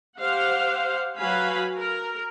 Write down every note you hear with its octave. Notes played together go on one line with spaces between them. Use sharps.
G4 C5 F5 F#5
F#3 F#4 B4 F5 G#5 B5
A#4